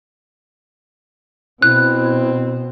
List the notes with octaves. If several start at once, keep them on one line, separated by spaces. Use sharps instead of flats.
B2 C4 E4 F#6